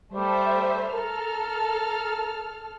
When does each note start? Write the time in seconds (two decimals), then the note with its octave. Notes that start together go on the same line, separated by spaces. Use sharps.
0.13 G3 A3 C5 E5
0.93 A4 A#4 F6